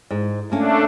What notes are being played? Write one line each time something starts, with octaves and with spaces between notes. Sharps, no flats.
G#2
A3 A#3 C#4 D4